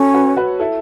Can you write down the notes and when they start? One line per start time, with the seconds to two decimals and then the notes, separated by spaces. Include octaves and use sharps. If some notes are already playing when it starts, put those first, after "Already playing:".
Already playing: C#4 F#4 A4 C#5
0.14 F#4 B4
0.37 F#4 B4
0.60 E4 A4